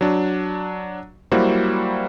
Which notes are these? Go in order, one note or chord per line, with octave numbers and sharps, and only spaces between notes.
F#3 D4
F#3 G3 A#3 E4 F#4 C5